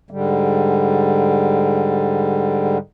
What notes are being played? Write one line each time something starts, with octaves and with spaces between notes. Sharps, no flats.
G#2 D3 G3